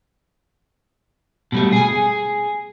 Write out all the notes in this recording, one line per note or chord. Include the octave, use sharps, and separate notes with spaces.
B2 G3 A3
G#4 G#5